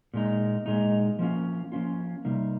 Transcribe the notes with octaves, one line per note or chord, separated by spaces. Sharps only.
A#2 G#3 D#4
A#2 G#3 D#4
F3 A#3 C#4 F4
F3 A#3 C#4 F4
C3 G3 A#3 D#4